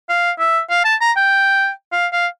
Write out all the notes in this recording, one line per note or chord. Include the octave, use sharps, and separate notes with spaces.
F5
E5
F5
A5
A#5
G5
F5
F5